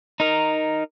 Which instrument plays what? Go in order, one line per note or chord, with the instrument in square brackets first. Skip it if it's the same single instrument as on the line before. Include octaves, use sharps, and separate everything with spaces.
[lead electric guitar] D#4 A#4